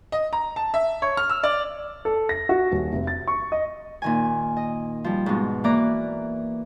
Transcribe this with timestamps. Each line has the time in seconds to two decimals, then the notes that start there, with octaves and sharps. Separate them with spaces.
0.12 D#5
0.33 A#5
0.56 A5
0.74 E5
1.02 C#5
1.17 F6
1.30 E6
1.43 D5
2.05 A4
2.29 A#6
2.49 F#4
2.72 D#1
2.93 F1
3.07 A6
3.28 C#6
3.52 D#5
4.02 A#2 D#3 G#5
4.57 D#5
5.04 F3 G3
5.26 G#2 B2
5.64 E3 A#3 D5 A#5 D6 F#6